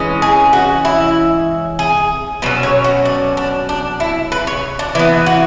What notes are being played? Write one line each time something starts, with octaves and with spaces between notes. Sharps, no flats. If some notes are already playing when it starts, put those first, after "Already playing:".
Already playing: E3 G#3 C#4
G#4
F#4
E4
G#4
B2 F#3 C#4 B4
C#5
F#4
D4
D4
D4
E4
B4
C#5
D4
E3 B3 E4
F#4